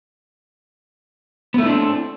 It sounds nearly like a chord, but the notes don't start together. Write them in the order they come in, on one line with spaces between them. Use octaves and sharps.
B3 A3 E4 D4 C4